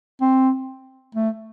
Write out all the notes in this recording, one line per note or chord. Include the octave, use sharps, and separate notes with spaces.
C4
A3